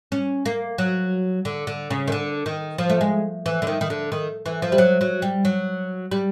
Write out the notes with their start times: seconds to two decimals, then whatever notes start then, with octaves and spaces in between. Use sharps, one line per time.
0.12 C#4
0.45 A#3
0.78 F#3
1.45 D3
1.67 D3
1.90 C#3
2.07 D#3
2.12 D3
2.46 D#3
2.78 F3
2.90 A3
3.01 G#3
3.46 E3
3.62 D3
3.67 D#3
3.81 D#3
3.90 D3
4.12 D#3
4.46 E3
4.62 F3
4.72 G3
4.78 F#3
5.01 F#3
5.22 G3
5.45 F#3
6.11 G3